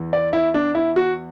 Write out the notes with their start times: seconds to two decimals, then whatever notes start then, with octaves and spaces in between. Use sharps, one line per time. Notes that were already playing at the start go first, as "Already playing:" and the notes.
Already playing: E2 E3
0.13 D5
0.33 E4
0.54 D4
0.75 E4
0.96 F#4